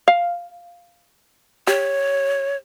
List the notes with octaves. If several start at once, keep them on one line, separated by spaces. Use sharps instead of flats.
F5
G4 C#5